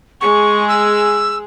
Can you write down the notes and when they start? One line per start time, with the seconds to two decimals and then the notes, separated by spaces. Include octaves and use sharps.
0.21 G#3 G#4 C#6
0.68 E6